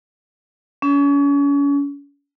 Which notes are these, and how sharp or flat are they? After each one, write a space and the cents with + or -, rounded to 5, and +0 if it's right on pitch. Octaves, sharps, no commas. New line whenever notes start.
C#4 +35